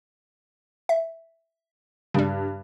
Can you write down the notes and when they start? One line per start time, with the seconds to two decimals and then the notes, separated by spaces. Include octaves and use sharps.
0.89 E5
2.14 G2 C#3 G3